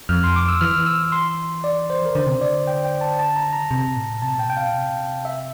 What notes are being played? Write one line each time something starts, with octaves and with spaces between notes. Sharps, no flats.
F2 F6
C6
D6
E6
E3 F6
E6
C6
D5
C5
A#4
D3 C5
C3
D3 D5
G5
G5
A5
A5
A#5
A#5
C3 A#5
A2
C3 A5
A#2 G5
C3 G5
F5
A#2
C3
E5